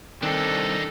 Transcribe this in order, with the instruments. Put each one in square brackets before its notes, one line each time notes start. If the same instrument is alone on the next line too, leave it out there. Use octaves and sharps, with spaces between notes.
[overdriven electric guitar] C2 C4 [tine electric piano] D#3 [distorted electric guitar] D4 D#4 [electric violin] A4